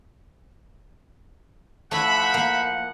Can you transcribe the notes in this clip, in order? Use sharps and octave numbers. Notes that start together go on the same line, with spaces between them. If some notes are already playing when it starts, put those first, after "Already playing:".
F3 A3 E4 E5 F#5 B5
A#3